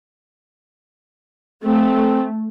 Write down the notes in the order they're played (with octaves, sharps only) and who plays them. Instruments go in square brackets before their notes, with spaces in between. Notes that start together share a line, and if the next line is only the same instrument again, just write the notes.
[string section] A3 [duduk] C4